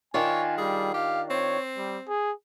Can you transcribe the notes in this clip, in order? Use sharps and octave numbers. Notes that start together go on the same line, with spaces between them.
D#3 D4 F4 C#5 G#5
G3 G#4
G4 F5
C4 C#5
G3
G#4